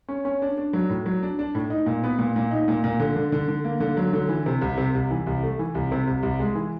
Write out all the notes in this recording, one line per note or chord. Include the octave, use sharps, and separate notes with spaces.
C#4
C#4
D4
D4
F#3
A2
F#3
D4
D4
A2
D#4
A#2
B3
A#2
A#2
D#4
A#2
A#2
D3
D3
D3
D3
A#3
D3
F#3
D3
E3
C3
C2
C3
C2
E3
C2
A3
E3
C2
C3
C2
C2
G#3
E3